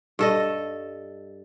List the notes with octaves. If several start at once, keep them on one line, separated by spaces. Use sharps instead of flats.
G2 A4 D#5